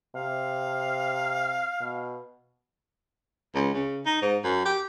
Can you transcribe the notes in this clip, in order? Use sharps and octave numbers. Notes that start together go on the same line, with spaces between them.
C3 F5
B2
C#2
C#3
D#4
G#2
F#2
G4